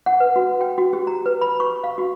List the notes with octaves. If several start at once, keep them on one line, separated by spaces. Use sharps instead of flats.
F#5
B4
F#4
G5
F#4
G4
A#5
B4
B5
C#6
F5
F#4